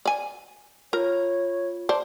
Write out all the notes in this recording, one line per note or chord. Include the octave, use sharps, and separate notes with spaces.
D5 G#5
F4 A#4 C#5
C5 D5 A5